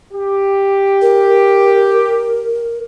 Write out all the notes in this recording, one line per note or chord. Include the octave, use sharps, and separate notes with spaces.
G4
A#4